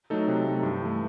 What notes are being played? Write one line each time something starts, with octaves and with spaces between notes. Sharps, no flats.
F#3 A3 D#4 A4
C3
F#3 A3 D#4 A4
G2
E3 A3